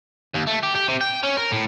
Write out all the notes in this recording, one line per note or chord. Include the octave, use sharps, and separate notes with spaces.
D#2
A3
G4
G4
C3
G5
C#4
A#4
A2